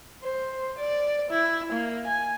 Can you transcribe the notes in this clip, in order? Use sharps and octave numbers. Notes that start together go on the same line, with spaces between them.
C5
D5
E4
A#3
G#5